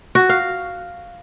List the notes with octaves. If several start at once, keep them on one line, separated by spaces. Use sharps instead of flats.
F#4
F5